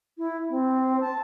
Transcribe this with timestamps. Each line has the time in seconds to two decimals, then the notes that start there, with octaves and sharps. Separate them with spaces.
0.18 E4
0.50 C4
1.01 A5